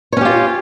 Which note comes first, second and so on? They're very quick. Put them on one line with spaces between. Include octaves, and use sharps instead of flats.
C#5 C#4 G4 F4